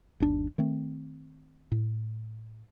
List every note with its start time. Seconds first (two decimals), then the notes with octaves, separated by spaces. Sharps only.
0.20 G1 D#2 D4
0.58 D#3 A3 C4
1.72 A2